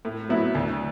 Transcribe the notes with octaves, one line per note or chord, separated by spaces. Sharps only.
A2
F#3 B3 E4
D2